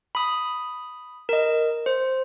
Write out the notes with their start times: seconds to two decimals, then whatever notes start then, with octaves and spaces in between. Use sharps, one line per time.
0.15 B5 D#6
1.29 A#4 D#5
1.86 C5